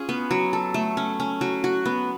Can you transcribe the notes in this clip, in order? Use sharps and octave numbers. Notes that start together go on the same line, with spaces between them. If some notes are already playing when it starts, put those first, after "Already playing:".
Already playing: C#4 F4 G#4
B3
F#3
A4
A3
C#4
C#4
F#3
F#4
B3